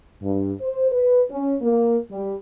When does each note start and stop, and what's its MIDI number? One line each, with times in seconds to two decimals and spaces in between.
0.23 0.52 43
0.61 0.90 72
0.91 1.21 71
1.31 1.54 61
1.62 1.97 58
2.11 2.35 55